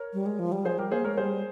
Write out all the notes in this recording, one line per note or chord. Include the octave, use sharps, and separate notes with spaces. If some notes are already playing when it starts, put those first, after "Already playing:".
Already playing: A#4 C#5
G3
G#3
F3
G3
F3 G#4 C5
G3 G4 A#4
A#3 G#4 C5
G#3 A#4 C#5
G3 G#4 C5